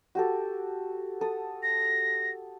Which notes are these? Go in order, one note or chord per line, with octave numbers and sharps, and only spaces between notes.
F#4 G4 A4
A4 D#6
A#6